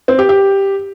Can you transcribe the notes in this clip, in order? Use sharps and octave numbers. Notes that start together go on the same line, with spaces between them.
C4
G4
G4